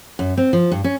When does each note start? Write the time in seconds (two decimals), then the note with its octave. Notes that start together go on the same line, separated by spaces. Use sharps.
0.19 F#2
0.37 C4
0.53 F3
0.72 G2
0.84 C#4